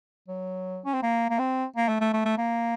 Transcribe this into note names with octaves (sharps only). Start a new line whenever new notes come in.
F#3
C#4
C4
A#3
A#3
C4
A#3
A3
A3
A3
A3
A#3